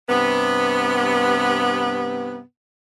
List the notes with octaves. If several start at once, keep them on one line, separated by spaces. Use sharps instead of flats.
G2 C3 B3